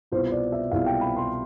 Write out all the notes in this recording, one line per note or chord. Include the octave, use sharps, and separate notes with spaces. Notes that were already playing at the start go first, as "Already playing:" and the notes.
C2 B2 B3 F4 C5
D5
E5
C2 B2 B3 F4 F5
G5
B5
C6